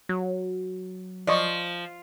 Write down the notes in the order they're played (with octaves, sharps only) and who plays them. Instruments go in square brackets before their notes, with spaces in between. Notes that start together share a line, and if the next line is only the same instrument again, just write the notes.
[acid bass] F#3
[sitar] F3 [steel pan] D5 D#5 C#6